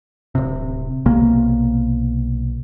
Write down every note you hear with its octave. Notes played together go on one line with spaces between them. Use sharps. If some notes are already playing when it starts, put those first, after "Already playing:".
D1 C3
B1 C3 A#3